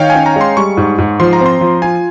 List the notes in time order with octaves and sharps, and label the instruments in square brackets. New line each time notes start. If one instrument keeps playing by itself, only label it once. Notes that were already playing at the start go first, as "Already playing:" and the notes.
Already playing: [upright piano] D#3 [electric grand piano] C#5 D#5 F5 G5
[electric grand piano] G#5
[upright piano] C#4
[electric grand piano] A#5
[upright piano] G#3 [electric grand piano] C6
[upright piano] G3 [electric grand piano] C#6
[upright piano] G#2
G#2
[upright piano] F3 [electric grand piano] C6
[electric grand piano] A#5
[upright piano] C4
[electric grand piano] C6
[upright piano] F3
[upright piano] F4 [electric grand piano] G#5